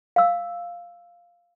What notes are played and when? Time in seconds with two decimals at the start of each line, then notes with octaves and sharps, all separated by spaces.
0.16 F5 E6